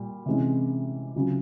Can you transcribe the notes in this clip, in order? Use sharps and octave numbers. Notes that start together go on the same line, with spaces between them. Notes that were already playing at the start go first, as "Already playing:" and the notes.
Already playing: A#2 G3
C3 E3 G#3 C#4
C#2 C#3 F#3